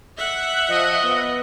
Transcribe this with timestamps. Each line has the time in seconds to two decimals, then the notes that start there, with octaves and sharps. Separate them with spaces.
0.17 E5 F#5
0.68 F3 D#5
1.04 B3